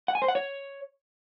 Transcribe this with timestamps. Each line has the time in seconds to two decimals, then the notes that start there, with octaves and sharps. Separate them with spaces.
0.08 F#5
0.15 G#5
0.22 C5
0.28 F#5
0.35 C#5